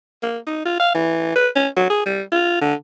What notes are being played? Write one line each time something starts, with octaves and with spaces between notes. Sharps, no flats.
A#3
D#4
F4
F5
E3
B4
C#4
F#3
G#4
G3
F4
D3